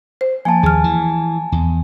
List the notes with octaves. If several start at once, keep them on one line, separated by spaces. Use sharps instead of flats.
C5
F3 A#3 G#5 A5
D#2 G#4 F6
E3
E2